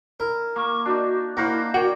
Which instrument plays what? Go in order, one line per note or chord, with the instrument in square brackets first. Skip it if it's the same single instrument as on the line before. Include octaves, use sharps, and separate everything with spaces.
[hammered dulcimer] E4 [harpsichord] A#4
[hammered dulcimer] A#3 [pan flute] C#6
[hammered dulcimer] D4 D#4 [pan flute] F#4
[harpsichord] A#3 [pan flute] E4 [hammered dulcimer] F#4 A#4 C5
[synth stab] F#4 [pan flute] A#4 [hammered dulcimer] C#5 D5 [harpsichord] G5